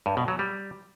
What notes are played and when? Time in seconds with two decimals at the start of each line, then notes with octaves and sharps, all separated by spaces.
0.06 G2
0.17 B2
0.28 F#3
0.39 G3